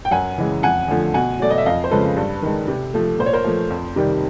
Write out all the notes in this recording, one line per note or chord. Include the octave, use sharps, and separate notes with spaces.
G5
F#2 F#5 G#5
C#3 E3 G#3
F2 F#5 G#5
D3 F3 A3
B2 F#5 G#5
F#3 A3 D5
D#5
E5
F2 D#5 F5
C5
C#3 F3 G#3 A4 B4
G2
D#3 G#3
C3
F3 A3
A#2 C5
C#5
A#4 C5
F3 A3
F2
C3 D#3 G3